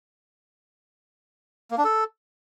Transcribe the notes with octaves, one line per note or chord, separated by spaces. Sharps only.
A#3
D4
A4